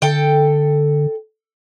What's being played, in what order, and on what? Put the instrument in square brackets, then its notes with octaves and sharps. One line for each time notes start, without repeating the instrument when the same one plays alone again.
[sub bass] D3 [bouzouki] A4 G5